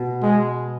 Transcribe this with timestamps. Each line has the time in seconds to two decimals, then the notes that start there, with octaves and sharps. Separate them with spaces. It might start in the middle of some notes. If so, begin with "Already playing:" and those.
Already playing: B2
0.22 G#3